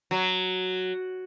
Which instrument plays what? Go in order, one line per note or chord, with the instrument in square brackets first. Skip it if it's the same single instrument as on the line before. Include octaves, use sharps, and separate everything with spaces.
[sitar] F#3